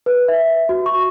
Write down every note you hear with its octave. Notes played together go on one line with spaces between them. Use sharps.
B4
E5
F#4
C#6